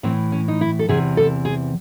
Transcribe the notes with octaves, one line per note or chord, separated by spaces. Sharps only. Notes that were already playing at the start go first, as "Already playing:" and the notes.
A2 E3 C4
C#4
D#4
E4
A4
E2 C3 E3 G#4
A4
G#4